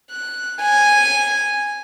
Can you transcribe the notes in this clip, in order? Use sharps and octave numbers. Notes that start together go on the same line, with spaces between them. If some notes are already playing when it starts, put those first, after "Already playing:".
F#6
G#5